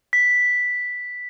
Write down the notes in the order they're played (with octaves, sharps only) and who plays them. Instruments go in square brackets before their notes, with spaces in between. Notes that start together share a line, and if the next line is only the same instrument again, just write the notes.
[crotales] B6